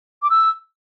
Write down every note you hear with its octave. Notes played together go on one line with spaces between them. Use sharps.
D6
E6